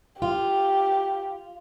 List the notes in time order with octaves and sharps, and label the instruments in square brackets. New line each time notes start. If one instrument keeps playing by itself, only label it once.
[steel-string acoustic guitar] F4 [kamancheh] G4